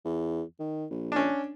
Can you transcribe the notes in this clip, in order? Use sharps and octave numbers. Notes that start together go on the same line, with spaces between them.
E2
D#3
A#1
C#4 D4